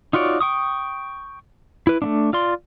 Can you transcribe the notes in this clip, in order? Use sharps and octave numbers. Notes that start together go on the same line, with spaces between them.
D#4 F4 F#4 C#5 D5
G5 C#6 D#6
E4 B4
A3 B3 D4
F4 D5 C6